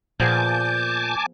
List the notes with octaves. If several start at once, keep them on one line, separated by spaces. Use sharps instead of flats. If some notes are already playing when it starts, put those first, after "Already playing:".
A#2 F3 B3 G#4 G#5 A5 D6 G6